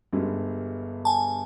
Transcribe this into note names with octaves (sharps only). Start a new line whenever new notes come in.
G1 G2 G#3
G#5 A5